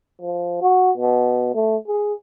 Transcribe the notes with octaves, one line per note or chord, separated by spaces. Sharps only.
F3
F#4
B2
A3
G#4